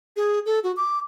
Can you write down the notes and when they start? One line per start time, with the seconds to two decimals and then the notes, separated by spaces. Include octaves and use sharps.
0.16 G#4
0.46 A4
0.64 F#4
0.77 D6